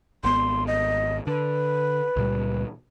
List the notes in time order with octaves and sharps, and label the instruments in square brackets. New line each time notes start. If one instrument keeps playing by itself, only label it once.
[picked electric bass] G#1 B3 [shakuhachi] C6
[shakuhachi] D#5
[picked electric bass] D3 [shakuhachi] B4
[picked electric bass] C#2 A#2 G3